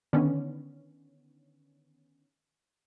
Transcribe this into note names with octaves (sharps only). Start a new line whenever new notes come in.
D3 D#3 B3 C#4